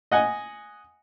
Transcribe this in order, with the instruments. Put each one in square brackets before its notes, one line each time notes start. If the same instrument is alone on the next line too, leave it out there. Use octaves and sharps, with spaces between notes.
[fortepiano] D#5 F#5 G#5